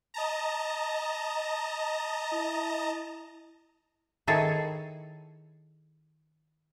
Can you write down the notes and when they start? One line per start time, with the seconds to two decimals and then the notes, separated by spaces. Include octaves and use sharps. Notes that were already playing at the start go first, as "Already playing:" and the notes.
0.14 D#5 A5 A#5
2.33 E4
4.27 D#3 E4 G#4 A4 C#5 A5